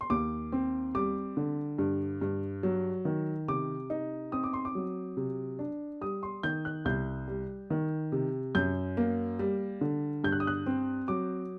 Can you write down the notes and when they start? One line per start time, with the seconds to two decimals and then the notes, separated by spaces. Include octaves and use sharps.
0.01 C6
0.10 D#2 D6
0.52 C4
0.95 G3 D6
1.37 D3
1.78 G2
2.21 G2
2.63 F#3
3.05 D#3
3.48 C3 D6
3.90 D#4
4.32 C4 D#6
4.44 D6
4.53 C6
4.65 D6
4.75 F#3
5.17 C3
5.59 D4
6.01 G3 D#6
6.23 C6
6.43 D#3 G6
6.65 F#6
6.85 C2 G6
7.28 G3
7.70 D#3
8.12 C3
8.55 F#2 G6
8.97 A#3
9.39 G3
9.81 D3
10.24 G2 G6
10.32 F#6
10.40 D#6
10.47 F#6
10.66 C4
11.08 F#3 D6